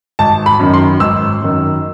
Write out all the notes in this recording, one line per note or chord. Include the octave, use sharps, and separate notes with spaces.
G#1 A5
B5
F#2 D#3
C6
G#1 E6
F#2 D#3